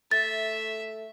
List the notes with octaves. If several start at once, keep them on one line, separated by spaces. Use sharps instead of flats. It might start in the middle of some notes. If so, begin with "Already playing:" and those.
A3 E5 A6